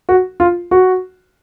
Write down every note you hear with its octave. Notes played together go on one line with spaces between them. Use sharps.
F#4
F4
F#4